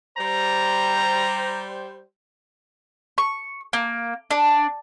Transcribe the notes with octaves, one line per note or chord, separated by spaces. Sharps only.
G3 C5 A#5
C#6
A#3
D4